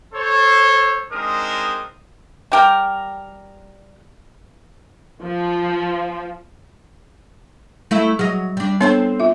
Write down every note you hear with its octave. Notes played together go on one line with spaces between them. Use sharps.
A4 C5 C#5
G#3 C4 D4 D#4 A#4 D#6
G3 G4 A#4
F3
A3 E4 E5
F#3 G#4 D#5
G3 D4
B3 C4 D4 A4 C5 C#5
F4 E5